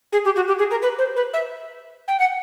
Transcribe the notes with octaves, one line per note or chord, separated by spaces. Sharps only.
G#4
G4
F#4
G4
G#4
A#4
B4
C5
B4
E5
G5
F#5